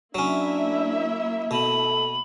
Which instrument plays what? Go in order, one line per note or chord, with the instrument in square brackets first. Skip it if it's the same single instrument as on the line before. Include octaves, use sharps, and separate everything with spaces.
[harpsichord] F#3 C#4 [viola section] A#3 E4 E5 [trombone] D4
[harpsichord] B2 [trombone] A4 [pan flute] B5